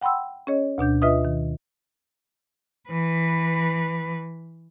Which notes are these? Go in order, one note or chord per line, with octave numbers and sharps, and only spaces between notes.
F#5 G5 B5 C6 E6
C#4 G#4 C#5 D#5
D2 B2 D4 G6
F4 B4 D#5 E5 D#6
D#3
E3 B4